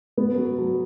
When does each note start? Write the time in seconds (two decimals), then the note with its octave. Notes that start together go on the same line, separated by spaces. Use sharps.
0.18 B3
0.37 F#3
0.58 F#3